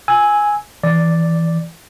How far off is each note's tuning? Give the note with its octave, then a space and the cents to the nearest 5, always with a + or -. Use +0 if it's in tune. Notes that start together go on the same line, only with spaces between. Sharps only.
G#5 +0 E6 -15
E3 +0 D5 +0